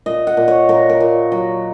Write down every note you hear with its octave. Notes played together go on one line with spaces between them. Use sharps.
A#2 D#5
F#5
A#2
C#5
A#2 A#4
A#4
A#2
F#3